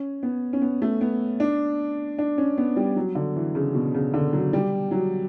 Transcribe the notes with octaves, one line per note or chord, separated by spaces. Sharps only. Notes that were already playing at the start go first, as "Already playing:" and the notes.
Already playing: C#4
B3
C#4
B3
A3
B3
D4
D4
C#4
B3
G3
F#3
D3
E3
C#3
B2
C#3
D3
F#3
G3
F#3